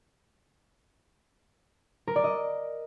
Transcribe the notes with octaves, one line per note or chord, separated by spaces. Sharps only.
A#4
D5
D#5